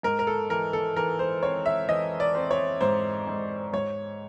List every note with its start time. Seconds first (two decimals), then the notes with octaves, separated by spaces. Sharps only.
0.03 G#2 A#4
0.19 A#4
0.27 A4
0.50 E3 A#4
0.73 A4
0.96 E3 A#4
1.19 C5
1.43 C4 C#5
1.66 E5
1.88 E3 D#5
2.20 D5
2.35 C4
2.51 C#5
2.81 G#2 C5
3.27 G#2
3.73 G#2 C#5